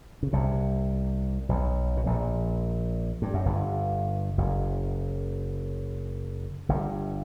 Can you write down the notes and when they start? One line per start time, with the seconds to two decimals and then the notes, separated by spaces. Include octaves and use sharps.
0.23 C#3
0.33 C2 C3
1.49 B1 B2
1.97 B2
2.06 A#1 A#2
3.22 G2
3.34 F#2
3.46 G1 G2
4.38 F#1 F#2
6.69 G1 G2